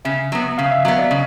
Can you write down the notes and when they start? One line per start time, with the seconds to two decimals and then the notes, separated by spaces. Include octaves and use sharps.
0.05 C#3 E5
0.32 F#3 B3
0.58 C#3 F5
0.71 E5
0.85 F#3 B3 D#5
0.98 D5
1.11 C#3 D#5